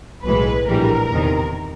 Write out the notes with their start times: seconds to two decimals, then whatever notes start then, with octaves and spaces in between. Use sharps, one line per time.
0.24 B1 A2 E3 G#3 B4
0.67 A#1 A2 E3 G3 A#4
1.11 E2 C3 D#3